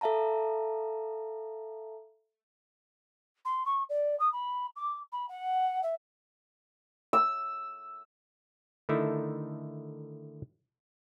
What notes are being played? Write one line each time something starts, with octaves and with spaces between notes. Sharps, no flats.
A4 E5 F5 A5 A#5
C6
C#6
D5
D#6
B5
D6
B5
F#5
E5
E6
D3 D#3 A3 D#4 E4